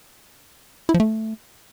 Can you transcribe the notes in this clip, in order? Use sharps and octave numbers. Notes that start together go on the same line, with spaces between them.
E4
F3
A3